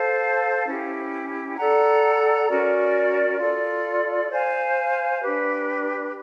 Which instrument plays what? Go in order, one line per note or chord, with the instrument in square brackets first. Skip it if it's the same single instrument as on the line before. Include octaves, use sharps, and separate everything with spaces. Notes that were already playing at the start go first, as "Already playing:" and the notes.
Already playing: [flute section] A4 C5 F5 A5
C#4 E4 G4
A4 D5 F#5 A#5
C#4 F#4 A#4 D5
F4 A4 D5
C5 F5 G#5
D4 G4 B4